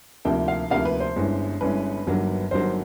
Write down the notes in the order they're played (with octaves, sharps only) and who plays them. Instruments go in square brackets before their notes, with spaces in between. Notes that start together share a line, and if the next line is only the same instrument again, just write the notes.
[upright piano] D2 C3 F3 A#3 D#4 G5
F5
D2 C3 F3 A#3 D#4 F5
B4
C5
G1 G2 E3 G#3 C#4
G1 G2 E3 G#3 C#4 B4
G1 G2 D#3 F#3 A#3
G1 G2 D#3 F#3 A#3 C5